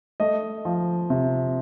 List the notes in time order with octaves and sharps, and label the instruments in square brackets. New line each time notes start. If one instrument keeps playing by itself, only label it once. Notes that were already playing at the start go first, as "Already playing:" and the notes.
[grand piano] A3 D#5
F3
C3